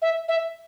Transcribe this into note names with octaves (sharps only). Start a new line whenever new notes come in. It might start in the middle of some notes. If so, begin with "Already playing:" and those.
E5
E5